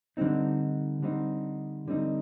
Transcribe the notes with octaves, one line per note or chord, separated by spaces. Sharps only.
D3 G3 C4 D#4
D3 G3 C4 D#4
D3 G3 C4 D#4